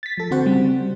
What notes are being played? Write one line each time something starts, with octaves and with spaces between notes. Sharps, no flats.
A6 B6
F3 A4
D3 C4 F#4 C5 F#5
C#3 G3 C4